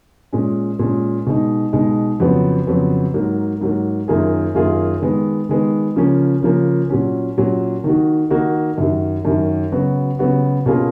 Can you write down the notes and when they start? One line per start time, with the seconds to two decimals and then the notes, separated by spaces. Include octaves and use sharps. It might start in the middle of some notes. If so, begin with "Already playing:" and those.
0.32 A#2 G#3 C#4
0.79 A#2 G#3 C#4
1.27 B2 G#3 D#4
1.73 B2 G#3 D#4
2.20 F2 C#3 F#3 B3
2.67 F2 C#3 F#3 B3
3.14 G#2 F#3 A#3
3.61 G#2 F#3 A#3
4.08 F#2 D#3 A#3 F4 G#4
4.55 F#2 D#3 A#3 F4 G#4
5.02 D#3 G#3 B3
5.49 D#3 G#3 B3
5.96 C#3 F3 A#3 C#4
6.43 C#3 F3 A#3 C#4
6.90 A#2 F#3 C#4
7.38 A#2 F#3 C#4
7.84 D#3 A#3 D#4 F#4
8.31 D#3 A#3 D#4 F#4
8.78 F#2 D#3 F#3
9.25 F#2 D#3 F#3
9.72 C#3 F#3 B3 F#4
10.19 C#3 F#3 B3 F#4
10.66 B2 A#3 C#4 F4 G#4